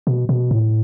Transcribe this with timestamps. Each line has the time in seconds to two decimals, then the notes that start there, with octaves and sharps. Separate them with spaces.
0.07 B2
0.29 B2
0.51 A2